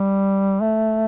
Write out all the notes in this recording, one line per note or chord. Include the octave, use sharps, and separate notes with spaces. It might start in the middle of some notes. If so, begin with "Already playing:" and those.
Already playing: G3
A3